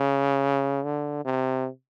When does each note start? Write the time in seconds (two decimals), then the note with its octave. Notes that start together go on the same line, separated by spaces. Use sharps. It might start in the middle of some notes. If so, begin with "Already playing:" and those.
Already playing: C#3
0.84 D3
1.25 C3